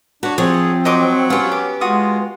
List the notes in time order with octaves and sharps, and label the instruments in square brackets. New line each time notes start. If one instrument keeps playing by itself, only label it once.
[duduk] D4 [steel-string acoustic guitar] F#4 [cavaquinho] B4 C#5
[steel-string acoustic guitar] F3 [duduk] C4 [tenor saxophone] G#4 [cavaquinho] C#5
[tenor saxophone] F#3 [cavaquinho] D#5 C6 D6
[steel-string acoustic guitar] B3 G4 [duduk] C#4 [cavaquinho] F4 C#6
[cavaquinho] D6
[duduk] G#3 [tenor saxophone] F4 [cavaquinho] F#4 D#6